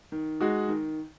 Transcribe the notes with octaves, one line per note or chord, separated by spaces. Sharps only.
D#3
G#3 D#4 F#4
D#3